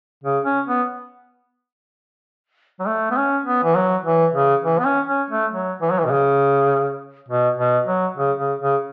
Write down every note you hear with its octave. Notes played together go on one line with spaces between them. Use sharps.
C#3
C#4
B3
F#3
A3
B3
C#4
B3
E3
F#3
E3
C#3
E3
B3
C#4
C#4
A3
F#3
E3
F#3
E3
B2
C#3
B2
B2
F#3
C#3
C#3
C#3